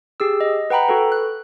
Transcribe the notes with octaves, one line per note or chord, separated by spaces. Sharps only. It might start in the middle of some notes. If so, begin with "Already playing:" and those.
G4 G#4 E6
D#5
B4 F#5 G5 A#5 B5
F#4 A4 B4
F#6